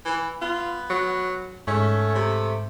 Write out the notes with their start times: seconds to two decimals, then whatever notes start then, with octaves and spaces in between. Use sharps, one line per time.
0.05 E3
0.41 B3 F4
0.90 F#3
1.68 G#2 A3 C#4
2.15 C3